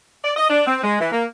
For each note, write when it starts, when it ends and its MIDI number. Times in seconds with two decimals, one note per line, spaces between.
0.23 0.31 74
0.36 0.46 75
0.49 0.66 62
0.66 0.79 60
0.83 0.96 56
0.99 1.08 52
1.12 1.24 58